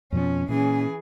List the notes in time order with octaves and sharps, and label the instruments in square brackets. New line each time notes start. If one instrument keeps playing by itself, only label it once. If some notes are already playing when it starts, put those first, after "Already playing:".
[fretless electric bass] F2 B2 F3 [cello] C#4
[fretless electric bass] A#2 [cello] E3 G#4 [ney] C#4